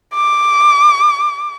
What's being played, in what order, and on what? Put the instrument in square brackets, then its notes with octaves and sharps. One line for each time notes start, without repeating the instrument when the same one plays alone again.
[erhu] D6